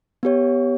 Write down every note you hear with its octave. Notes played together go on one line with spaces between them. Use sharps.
B3 G4 C#5